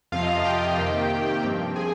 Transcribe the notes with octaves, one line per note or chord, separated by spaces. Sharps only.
F2 C3 F3 F4 F5
D#5
F5
G4 G5
C3 D#3 A#3
G2 F3 C4
G#4 G#5